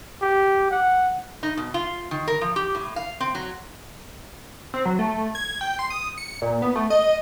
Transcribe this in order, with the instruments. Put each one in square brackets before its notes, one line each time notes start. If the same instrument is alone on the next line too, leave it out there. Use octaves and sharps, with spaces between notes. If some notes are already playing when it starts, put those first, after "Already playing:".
[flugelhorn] G4
F#5
[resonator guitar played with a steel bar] D#4
B2
F4
D#3
A#4
F3
G4
A2
F5
C4
F#3
[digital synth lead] C4
F#3
A3
G#6
G5
C6
D#6
C#7
A#2
B3
A3
D#5